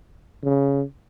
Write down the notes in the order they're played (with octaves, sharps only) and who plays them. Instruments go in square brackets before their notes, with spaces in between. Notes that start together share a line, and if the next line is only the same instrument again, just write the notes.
[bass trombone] C#3